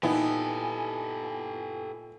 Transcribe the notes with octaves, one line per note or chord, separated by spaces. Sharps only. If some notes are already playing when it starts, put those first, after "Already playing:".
A#2 B3 D#4 E4 G4 A4 G#5